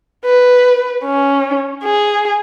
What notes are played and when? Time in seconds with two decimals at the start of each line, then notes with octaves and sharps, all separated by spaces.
0.24 B4
1.05 C#4
1.84 G#4